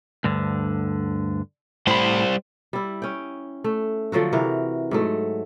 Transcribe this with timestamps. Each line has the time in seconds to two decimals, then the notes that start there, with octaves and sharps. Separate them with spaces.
0.24 D2 G2 D3
1.87 A2 G3 C5 B5
2.73 G3 E4
3.02 C#4 G5
3.64 A3
4.12 D3 F3 F#3 F#4
4.32 C3 E3 A#4
4.91 G#2 F#3 A3